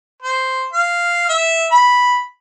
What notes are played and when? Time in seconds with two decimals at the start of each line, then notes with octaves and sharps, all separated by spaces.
0.23 C5
0.73 F5
1.29 E5
1.72 B5